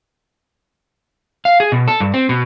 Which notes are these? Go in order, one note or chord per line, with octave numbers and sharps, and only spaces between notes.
F5
G#4
B2
A4
G2
C4
B2